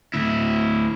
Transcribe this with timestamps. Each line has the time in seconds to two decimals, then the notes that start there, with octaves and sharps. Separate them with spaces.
0.14 D2 E4